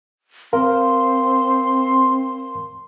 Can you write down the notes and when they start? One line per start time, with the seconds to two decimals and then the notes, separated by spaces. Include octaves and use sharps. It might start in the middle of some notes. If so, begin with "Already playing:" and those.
0.53 C4 A#4 F5 C6